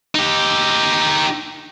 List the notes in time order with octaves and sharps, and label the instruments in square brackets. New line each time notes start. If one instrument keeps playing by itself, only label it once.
[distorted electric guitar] D#4 G4